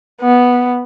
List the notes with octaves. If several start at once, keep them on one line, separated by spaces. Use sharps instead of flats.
B3